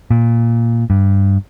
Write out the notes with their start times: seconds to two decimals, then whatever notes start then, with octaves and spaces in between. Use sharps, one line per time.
0.11 A#2
0.90 G2